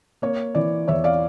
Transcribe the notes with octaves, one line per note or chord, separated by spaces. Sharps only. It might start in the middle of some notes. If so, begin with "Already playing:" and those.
A#3 C#5
E3 D5
E2 C#5 E5
D5 F5